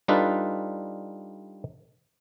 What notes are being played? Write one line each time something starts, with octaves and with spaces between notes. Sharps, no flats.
G3 D4 D#4 F4 A4 B4